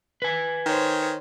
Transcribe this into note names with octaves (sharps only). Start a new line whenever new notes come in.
B4 G#5
D#3 C5 C#5